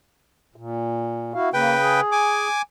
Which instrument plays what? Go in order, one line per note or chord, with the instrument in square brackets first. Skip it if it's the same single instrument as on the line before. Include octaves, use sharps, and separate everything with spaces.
[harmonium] A#2
E4 F#4 F5
[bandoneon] C#3 B4 G5 [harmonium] A#3
[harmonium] G#4
[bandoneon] G#5 D6